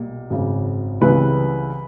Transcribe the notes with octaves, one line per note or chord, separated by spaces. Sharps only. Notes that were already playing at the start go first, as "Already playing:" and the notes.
Already playing: B1 A#2 G3
G#1 F#2 C#3
C#2 C#3 E3 G3 C4 B4